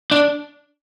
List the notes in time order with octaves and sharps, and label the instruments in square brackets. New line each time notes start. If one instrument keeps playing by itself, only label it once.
[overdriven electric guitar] D4